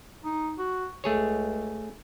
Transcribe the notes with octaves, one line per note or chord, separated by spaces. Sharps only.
D#4
F#4
C#2 A3 G#4 C#5